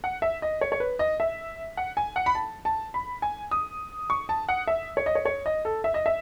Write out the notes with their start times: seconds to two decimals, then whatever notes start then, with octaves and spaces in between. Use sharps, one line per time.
0.04 F#5
0.22 E5
0.42 D#5
0.61 C#5
0.72 C#5
0.80 B4
0.99 D#5
1.20 E5
1.77 F#5
1.97 G#5
2.16 F#5
2.26 B5
2.35 A5
2.65 A5
2.94 B5
3.22 G#5
3.51 D#6
4.10 C#6
4.29 A5
4.49 F#5
4.67 E5
4.97 C#5
5.06 D#5
5.15 C#5
5.25 C#5
5.46 D#5
5.65 A4
5.84 E5
5.94 D#5
6.06 E5